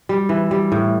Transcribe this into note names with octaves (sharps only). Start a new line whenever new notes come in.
G3
E3
G3
A2